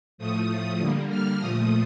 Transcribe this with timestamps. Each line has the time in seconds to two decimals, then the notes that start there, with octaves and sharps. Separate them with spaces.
0.18 A2 F3 A3 D#6
0.79 D3 G3 A#3
1.09 F6
1.40 A#2 F3 A3 D#6